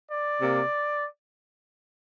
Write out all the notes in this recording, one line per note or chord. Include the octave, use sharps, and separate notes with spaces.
D5
C3 A#3